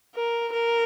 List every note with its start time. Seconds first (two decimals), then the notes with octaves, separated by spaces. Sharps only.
0.15 A#4
0.53 A#4